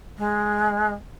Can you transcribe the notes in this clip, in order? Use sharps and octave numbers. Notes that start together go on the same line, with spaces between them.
G#3